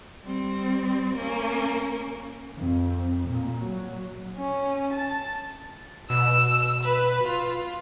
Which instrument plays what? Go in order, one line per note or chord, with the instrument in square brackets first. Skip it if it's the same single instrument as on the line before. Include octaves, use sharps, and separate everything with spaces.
[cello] G3 C4
A#3 C#4
[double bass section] F2
A#2
F#3
[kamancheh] C#4
A5
[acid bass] B2 [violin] E6
[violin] B4
F4